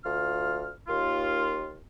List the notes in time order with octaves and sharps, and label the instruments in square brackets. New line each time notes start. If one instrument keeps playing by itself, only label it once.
[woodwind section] D2 F4 F6
D#2 F4